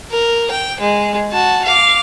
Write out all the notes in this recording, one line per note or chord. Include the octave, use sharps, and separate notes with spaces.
A#4
G5
G#3
F#4 A5
F5 D6